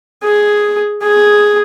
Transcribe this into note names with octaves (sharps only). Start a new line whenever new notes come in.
G#4
G#4